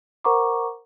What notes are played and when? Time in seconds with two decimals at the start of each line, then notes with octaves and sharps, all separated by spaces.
0.25 A#4 C5 F#5 A#5 C#6 D6